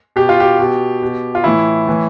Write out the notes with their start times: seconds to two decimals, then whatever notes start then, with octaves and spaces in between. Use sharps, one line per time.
0.16 B2 G4
0.29 F4
0.40 G4
0.59 B2
1.02 B2
1.35 F4
1.44 A2 E3 E4
1.87 A2 E3